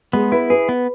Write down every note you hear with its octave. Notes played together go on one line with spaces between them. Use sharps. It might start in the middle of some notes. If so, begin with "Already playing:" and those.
G#3 B3
E4 B4
G#4 B4
B3